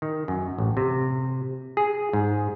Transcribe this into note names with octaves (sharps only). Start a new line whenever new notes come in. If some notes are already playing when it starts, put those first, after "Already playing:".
D#3
F#2
A1
C3
G#4
G#2